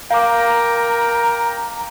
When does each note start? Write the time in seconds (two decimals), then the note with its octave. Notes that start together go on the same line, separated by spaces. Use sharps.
0.11 A#4 F5 G5 A#5 D6